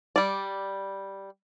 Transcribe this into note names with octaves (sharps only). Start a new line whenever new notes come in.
G3 D5